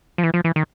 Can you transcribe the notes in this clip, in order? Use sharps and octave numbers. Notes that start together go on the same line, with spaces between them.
F3
E3
F3
E3
D#3